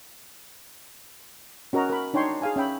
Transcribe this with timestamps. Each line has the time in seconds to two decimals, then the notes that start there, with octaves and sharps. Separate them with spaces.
1.73 C#4 F#4 A#4 D#5 A#5
1.90 A#4 B5
2.14 D4 D#4 C#5 G5 C6
2.42 G#4 F5 G#5
2.56 C#4 E5 G5 B5